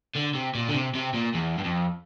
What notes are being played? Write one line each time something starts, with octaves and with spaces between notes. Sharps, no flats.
D3
C3
A#2
D3
C3
C3
A#2
E2
G2
F2